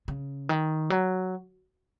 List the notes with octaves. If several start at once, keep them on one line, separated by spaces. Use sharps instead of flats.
C#3
D#3
F#3